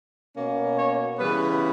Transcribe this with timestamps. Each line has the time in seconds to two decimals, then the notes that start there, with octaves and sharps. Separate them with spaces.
0.35 B2 A#3 C#4
0.77 C#5
1.18 C#3 E3 G3 B3 B4